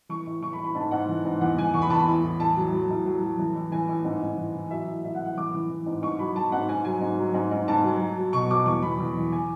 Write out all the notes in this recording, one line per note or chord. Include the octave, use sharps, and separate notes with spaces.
E3 C#6
A2
E3 C#6
B5
A2
B5
G#2 A5
G#2 F#5
E3
G#2
E2 F#5
E2 G#5
E2 C#6
B5
E2 A5
B5
A2
A2
A2 A5
F#3
F#3
A2
F#3
F#3
E3
A2
E3 G#5
A2
G#2
G#2
E3
E3
F#3 E5
A2
A2 E5
F#5
A2
F#5
E3 D6
E3
E3
G#2
G#2 C#6
F#3 B5
F#3 A5
G#2 F#5
G#2 G#5
F#3 G#5
G#2
F#3
G#2
G#2
G#2 A5
F#3
F#3
F#3
B2 C#6
F#3 D6
E2 C#6
E2 B5
E2
E3
G#5